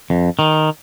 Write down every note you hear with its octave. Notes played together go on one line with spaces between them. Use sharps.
F2
D#3